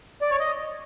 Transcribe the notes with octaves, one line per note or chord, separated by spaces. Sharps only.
D5
C#5
D#5